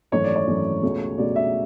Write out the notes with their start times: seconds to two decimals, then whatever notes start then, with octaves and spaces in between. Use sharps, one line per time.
0.12 G#1 F#2 E3 A3 C#5
0.24 D5
0.36 C#5
0.47 G#1 F#2 E3 A3
0.83 C#2 B2 A3
1.18 C#2 B2 A3 D5
1.36 E5